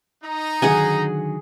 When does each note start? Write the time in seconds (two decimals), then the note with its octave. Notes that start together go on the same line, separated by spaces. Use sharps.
0.23 D#4 A#5
0.62 D3 D#3 F#3 G#4 F#5 G#5